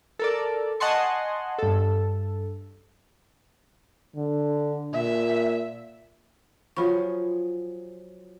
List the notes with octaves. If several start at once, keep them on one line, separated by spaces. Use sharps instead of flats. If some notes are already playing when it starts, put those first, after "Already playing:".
A4 A#4 D5
D#5 F#5 G#5 A5 C6 C#6
G2 A4
D3
A#2 E5
F3 F#3 F4 G#4 B5 C#6